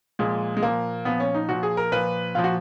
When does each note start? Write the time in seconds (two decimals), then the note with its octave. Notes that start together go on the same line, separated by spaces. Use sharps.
0.19 A#2 F3 G#3
0.57 G#3
0.62 A#2 F3 A#3
1.05 A#2 F3 B3
1.20 C#4
1.34 D#4
1.49 A#2 F3 F#4
1.63 G#4
1.77 A#4
1.92 A#2 F3 B4
2.35 A#2 F3 F4
2.44 F#4